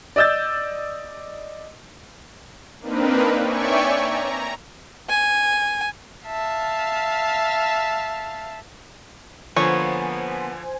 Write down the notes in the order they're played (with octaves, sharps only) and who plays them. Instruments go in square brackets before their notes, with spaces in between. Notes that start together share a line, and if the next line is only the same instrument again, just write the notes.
[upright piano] D5 D#5 E6 G6 A6
[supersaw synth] A#3 C4 D4 D#4 A#4 B4
C#5 D5 E5 G5 G#5 C#6
A#5
[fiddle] G#5
[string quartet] E5 F5 A5
[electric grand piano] D3 F3 [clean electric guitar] A#3 B3 [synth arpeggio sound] C5 G#5 [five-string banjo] C#5